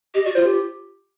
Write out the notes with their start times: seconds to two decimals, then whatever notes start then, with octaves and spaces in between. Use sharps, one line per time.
0.14 G4 D#5
0.25 F#4 D5
0.35 F4 C5
0.45 G4